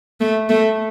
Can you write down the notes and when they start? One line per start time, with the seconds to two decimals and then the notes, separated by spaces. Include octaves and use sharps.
0.21 A3
0.50 A3